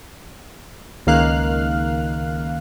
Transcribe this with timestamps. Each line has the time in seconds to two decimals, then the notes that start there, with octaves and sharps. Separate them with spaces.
1.07 C#2 D#3 A#3 F5 F6 F#6